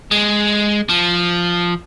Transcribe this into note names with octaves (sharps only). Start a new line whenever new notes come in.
G#3
F3